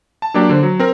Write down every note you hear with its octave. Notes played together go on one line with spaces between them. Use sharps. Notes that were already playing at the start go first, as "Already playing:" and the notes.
A5
F#3 A#3 D4 G4 D5
D3 C5
F#3
C4 A#4